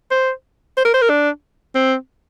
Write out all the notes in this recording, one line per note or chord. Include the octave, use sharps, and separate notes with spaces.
C5
C5
A#4
C5
A#4
D4
C4